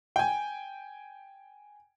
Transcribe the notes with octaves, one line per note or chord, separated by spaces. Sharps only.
G5 G#5